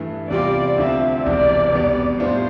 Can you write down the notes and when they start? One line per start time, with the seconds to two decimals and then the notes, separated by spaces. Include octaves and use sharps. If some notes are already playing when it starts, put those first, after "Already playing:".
Already playing: G2 E3 A3
0.30 E2 C3 G3 C4 F4 D5
0.77 D2 D3 F3 C4 E5
1.24 E1 E2 C3 E3 D5
1.72 F1 E2 B2 G3 B3
2.19 A2 G3 B3 D4 F4 C5